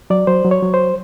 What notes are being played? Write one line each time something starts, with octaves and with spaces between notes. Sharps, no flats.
F#3 D5
F#3 C5
F#3
C#5
F#3
C5